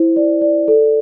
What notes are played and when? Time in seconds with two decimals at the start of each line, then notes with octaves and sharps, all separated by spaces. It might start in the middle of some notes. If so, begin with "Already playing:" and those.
Already playing: E4 C5
0.16 D5
0.42 D5
0.68 A4